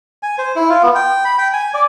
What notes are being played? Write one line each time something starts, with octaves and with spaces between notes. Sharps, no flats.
G#5
C5
E4
F4
B3
G5
B5
G5
G#5
D5